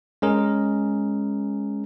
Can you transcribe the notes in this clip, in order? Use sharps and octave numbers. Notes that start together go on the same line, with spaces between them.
G#3 C#4 G#4 A#4